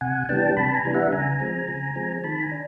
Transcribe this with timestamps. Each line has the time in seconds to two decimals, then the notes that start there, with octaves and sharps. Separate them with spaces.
0.01 C3 F#5 G#5
0.29 E3 G3 B3 D4 G5 A5
0.57 C3 A5 B5
0.75 G#5 A#5
0.85 E3 G3 B3 D4
0.94 E5 F#5
1.12 C#3 G#5 A#5
1.40 F3 G#3 C4
1.68 C#3
1.96 F3 G#3 C4
2.24 D#3 A5 B5
2.42 G#5 A#5
2.51 D4